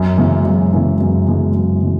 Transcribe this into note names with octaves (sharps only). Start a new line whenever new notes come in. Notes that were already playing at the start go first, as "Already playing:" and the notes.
Already playing: F#2
C#3 E3 G#3
F#2
C#3 E3 G#3
F#2
C#3 E3 G#3
F#2
C#3 E3 G#3